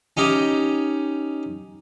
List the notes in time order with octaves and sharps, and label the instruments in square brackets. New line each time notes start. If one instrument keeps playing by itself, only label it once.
[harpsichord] C#4 D#4 G4